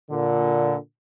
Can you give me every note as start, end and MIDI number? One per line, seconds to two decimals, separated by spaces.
0.11 0.74 46
0.11 0.74 50